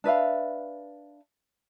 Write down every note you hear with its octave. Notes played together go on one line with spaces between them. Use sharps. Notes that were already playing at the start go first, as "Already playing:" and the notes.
D4 B4 E5 F5